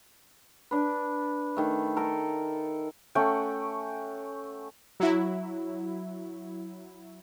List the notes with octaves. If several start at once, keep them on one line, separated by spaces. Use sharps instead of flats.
D4 B4
D#3 A3
A4 A#4
A3 C#4 F#5 G5
F#3 E4